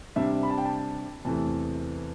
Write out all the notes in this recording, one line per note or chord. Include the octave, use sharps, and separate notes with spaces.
C3 G3 D4 E5
B5
A5
G5
A5
E2 C3 E3 A3 A5